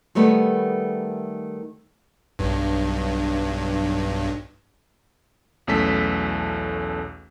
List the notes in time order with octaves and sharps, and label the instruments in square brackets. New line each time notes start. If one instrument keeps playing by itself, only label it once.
[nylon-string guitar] D#3 G3 A3 B3
[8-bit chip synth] B1 G2
[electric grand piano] B1 E2 A3 C#4 A4 B6